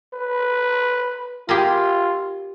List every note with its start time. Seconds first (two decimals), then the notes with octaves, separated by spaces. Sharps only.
0.13 B4
1.49 F4 G4 G#4 A#4